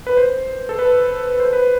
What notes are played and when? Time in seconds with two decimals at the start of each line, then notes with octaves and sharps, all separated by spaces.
0.07 B4
0.17 C5
0.69 A4
0.79 B4
1.40 C5
1.53 B4